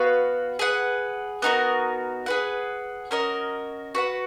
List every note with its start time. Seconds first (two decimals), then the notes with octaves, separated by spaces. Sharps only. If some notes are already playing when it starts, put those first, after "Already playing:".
Already playing: B3 F#4 B4 F5
0.59 G#4 B4 F#5
1.42 B3 D#4 F#4 A#4
2.26 G#4 B4 F#5
3.11 C#4 F#4 A#4 D#5
3.95 F#4 B4 F#5